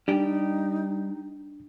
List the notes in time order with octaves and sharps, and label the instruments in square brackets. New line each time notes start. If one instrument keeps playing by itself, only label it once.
[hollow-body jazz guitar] G3 G4 [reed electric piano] D4 [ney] D#4